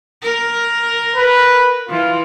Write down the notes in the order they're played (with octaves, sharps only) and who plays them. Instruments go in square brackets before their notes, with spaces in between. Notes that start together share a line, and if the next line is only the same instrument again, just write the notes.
[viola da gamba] A#4
[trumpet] B4
[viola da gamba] E3 [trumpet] F4